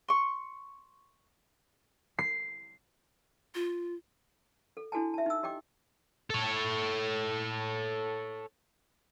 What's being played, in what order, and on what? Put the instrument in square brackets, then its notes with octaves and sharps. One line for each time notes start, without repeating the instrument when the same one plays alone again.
[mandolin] C6 C#6
[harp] C7
[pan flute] F4
[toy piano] A4
D4 E4 F#4 A4 G#5 A5
E5 A5
D#4 E6
G4 D#5 G5 D6
[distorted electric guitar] A4 C#5